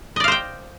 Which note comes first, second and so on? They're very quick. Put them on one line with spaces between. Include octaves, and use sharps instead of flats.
D#5 D5 F5 C5 G5